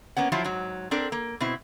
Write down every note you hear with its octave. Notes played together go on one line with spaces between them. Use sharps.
A#3 B3 C#4 F#5
F3 F#3 E4 F4
G#2 F#3
C4 D4 A4 A#4 D5
A#3
B2 C4 E4